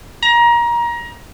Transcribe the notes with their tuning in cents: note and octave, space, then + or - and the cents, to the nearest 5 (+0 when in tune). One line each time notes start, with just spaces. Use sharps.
A#5 +25